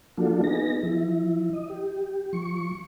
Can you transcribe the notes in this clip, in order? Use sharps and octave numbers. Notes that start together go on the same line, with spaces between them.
F3 A#3 D4 F4 F#4 A4
B3 D#4 G#4 A#6
F3 E4
D#5
G4
F3 C#6